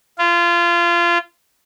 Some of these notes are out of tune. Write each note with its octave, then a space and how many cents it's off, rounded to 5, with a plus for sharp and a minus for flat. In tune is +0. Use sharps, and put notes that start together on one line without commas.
F4 -25